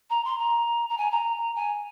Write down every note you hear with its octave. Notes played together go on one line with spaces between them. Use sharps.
A#5
C6
A#5
A#5
G#5
A#5
G#5